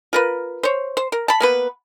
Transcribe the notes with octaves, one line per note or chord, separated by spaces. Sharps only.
F4 A#4 B4
C5 C#5
C5
A#4
A5 B5
A#3 B3 B4